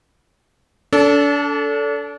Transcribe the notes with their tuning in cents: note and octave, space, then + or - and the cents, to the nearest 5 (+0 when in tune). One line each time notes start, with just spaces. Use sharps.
D4 -35 A4 +0